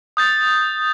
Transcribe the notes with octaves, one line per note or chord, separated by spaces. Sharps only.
D#6 G6 A6